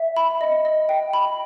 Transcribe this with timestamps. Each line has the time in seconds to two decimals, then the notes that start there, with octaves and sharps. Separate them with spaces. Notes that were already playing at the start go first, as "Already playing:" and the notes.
Already playing: E5
0.17 B5
0.41 D#5
0.65 D#5
0.89 G5
1.13 B5